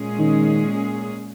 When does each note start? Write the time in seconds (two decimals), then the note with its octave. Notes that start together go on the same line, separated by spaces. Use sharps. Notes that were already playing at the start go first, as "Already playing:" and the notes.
Already playing: A#2 G#3 C#4 G#4
0.19 D#3